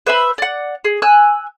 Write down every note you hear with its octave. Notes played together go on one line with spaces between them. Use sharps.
B4 C5 E5 B5
D5 F#5
G#4
G#5 E6 F#6